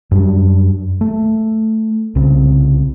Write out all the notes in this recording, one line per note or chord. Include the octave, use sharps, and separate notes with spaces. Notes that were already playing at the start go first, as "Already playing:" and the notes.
F#2 G3 D4
A3
C2 C#3 C4